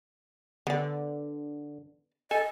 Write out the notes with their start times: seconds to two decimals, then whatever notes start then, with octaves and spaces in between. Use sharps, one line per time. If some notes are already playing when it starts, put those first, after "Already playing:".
0.67 D3 B3 D5
2.31 A4 D#5 G#5